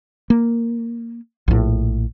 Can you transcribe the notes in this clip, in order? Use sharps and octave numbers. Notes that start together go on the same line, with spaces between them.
A#3
A#1 A2